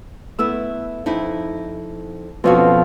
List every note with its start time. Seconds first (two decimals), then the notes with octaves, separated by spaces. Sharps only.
0.39 A3 B3 E4 E6
1.06 F2 D#4 E4
2.44 F2 B2 B3 C#4 F#4 F5